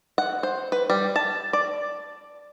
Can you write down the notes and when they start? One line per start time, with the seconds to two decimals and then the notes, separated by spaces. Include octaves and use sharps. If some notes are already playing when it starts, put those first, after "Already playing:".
0.18 F#5
0.43 C5
0.72 B4
0.90 G3
1.16 A5
1.53 D5